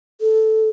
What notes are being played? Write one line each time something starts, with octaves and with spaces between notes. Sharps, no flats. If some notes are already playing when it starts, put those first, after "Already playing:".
A4